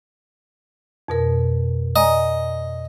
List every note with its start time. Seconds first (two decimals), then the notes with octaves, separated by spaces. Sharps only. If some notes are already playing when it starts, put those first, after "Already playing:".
1.08 F2 B2 A#4
1.96 D5 D#5 G#5 A#5